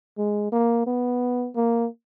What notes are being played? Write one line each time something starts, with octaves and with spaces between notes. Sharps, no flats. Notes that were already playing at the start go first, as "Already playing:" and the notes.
G#3
A#3
B3
A#3